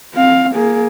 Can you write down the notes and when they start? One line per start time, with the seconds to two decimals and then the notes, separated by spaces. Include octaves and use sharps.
0.14 C4 F5
0.54 A#3 G#4